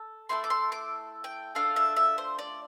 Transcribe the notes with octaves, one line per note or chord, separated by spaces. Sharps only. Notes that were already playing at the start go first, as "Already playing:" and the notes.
Already playing: A4
A3 E4 A4 C6
D6
C6
D6
G5
A3 D4 F4 A4 F5
E5
E5
C5
D5